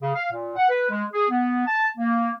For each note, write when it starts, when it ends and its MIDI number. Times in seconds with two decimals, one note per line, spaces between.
0.02 0.10 49
0.14 0.29 77
0.32 0.52 46
0.56 0.67 78
0.69 0.88 71
0.90 1.04 56
1.13 1.27 68
1.29 1.65 59
1.66 1.87 81
1.98 2.30 58